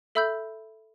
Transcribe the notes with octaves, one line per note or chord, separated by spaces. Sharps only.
A4 E5 B5 E6 G6